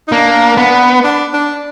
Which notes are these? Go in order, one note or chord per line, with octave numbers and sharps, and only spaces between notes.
D#4
A#3 D4
B3
D4
D4